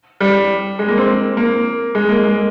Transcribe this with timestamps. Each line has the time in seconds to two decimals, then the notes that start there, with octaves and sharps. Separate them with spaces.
0.20 G3
0.79 G#3
0.88 A#3
0.98 C4
1.37 A#3
1.95 G#3
2.08 A#3
2.24 G#3